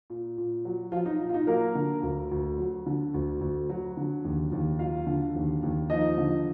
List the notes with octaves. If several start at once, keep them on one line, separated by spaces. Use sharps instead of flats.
A#2
A#2
F#3
F3 F#3 F4
D#4
A#2
F4
D#4
F#3 A#3 A#4
D3
D2
D2
F#3
D3
D2
D2
F#3
D3
D#2
D#2
F#3 F4 F5
D3
D#2
D#2
F3 D#4 D#5
D3